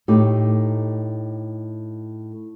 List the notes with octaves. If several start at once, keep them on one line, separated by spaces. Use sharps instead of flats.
A2 D#4 G4